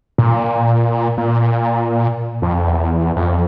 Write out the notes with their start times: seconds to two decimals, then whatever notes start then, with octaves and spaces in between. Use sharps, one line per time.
0.18 A#2
1.18 A#2
2.42 F2
2.67 E2
3.16 F2